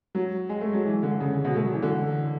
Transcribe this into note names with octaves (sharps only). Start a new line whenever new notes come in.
F#3
G#3
A3
F#3
E3
D3
C#3
B2
A3
F#3
E3
D3